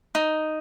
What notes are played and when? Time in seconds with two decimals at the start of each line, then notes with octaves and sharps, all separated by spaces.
0.15 D#4